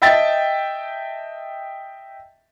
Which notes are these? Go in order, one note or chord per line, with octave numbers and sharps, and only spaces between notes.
D#5 E5 G5 A5 E6 A6